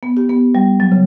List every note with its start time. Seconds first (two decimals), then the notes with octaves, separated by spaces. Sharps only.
0.03 B3
0.17 G4
0.29 B3
0.55 G3
0.80 F#3
0.92 C#3